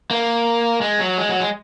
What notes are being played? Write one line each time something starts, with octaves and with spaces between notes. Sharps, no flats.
A#3
G#3
F#3
G#3
F#3
G#3